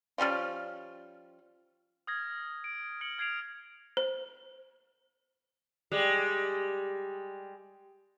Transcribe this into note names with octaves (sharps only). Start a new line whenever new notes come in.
F3 G3 C#4 F4
D#6 F6 G#6 A#6
D7
F6 C#7 D7 F#7
F6 G#6 C7 D7 F7
C5
G3 G#3